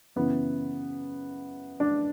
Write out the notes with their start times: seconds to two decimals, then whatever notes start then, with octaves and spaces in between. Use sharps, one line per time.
0.16 F#2 C#3 E3 B3
1.80 D4